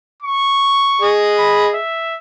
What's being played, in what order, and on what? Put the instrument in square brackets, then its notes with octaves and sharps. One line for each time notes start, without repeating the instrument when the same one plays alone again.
[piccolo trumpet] C#6
[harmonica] G#4 D#5
[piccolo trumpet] B5
E5